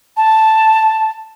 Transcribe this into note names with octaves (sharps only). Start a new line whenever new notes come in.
A5